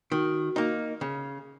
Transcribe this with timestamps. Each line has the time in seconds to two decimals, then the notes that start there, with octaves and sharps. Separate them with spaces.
0.11 D#3 F#4
0.56 A#3 D#4
1.01 C#3